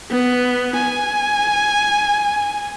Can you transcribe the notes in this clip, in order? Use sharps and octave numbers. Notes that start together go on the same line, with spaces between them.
B3
G#5